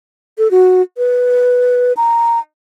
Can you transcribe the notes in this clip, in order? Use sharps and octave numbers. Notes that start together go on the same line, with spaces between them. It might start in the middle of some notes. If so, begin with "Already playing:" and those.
A4
F#4
B4
A#5